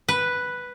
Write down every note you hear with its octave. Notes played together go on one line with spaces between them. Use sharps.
B4